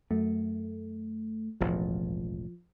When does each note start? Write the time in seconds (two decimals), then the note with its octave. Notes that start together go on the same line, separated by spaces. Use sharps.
0.11 F#2 A3
1.61 E1 A1 D#2 F3